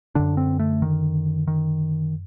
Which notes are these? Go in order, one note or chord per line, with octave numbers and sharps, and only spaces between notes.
F#2 D3 D4
C4
A3
D#3
D#3